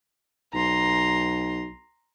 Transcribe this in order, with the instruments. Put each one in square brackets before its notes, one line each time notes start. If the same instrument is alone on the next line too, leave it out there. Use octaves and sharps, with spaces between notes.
[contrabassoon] B1 [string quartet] A#5 C6